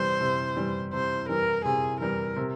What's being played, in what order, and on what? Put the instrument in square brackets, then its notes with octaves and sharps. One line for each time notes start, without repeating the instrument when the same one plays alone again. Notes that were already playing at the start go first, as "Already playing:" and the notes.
Already playing: [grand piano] C3 E3 G3 [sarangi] C5
[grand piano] C3
E3 G3
[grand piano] C3 [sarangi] C5
[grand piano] E3 G3 [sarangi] A#4
[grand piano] C3 [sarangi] G#4
[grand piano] E3 G3 [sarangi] A#4
[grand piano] C3